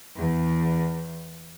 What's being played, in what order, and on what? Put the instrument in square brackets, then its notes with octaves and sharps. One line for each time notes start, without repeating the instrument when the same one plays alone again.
[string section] E2